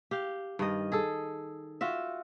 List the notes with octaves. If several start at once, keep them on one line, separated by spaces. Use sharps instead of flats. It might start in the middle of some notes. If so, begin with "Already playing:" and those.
G4 F5
G2 D#3 D#5
G#4 A4
F4 F#4 E5